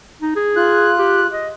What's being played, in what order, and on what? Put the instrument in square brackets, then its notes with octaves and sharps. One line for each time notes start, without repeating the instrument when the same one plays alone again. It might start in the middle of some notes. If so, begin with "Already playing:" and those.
[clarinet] D#4
G#4
[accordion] F4 F#6
[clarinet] G4
D#5